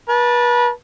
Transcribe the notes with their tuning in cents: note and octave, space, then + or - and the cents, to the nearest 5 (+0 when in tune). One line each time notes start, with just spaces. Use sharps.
B4 -35 A5 +0